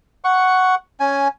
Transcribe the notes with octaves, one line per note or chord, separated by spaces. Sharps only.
F#5 C#6
C#4 G#5